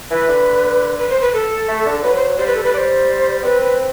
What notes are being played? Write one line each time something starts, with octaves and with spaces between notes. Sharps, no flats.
E3 B4
D3
B4
C5
B4
A4
A3
D3
F#3 B4
C5
G3 C5
B4
A4
B4
D5
C5
C4 B4
B4